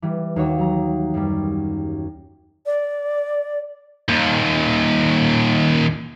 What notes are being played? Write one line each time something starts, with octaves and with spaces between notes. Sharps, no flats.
E3 G3
D#2 F#4 C#5 C#6
F#3 A#5
F#2 G3
D5
D#2 A#2